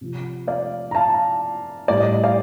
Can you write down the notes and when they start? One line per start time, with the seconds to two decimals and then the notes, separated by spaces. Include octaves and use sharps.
0.01 C3 F3
0.47 D5 F5
0.91 A#5
0.95 F5 A5
1.88 A2 G3 D5
2.00 D#5
2.12 D#5
2.23 D5 F5